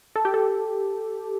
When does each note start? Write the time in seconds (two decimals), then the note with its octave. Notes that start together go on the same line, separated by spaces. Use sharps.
0.16 A4
0.25 G4
0.34 A4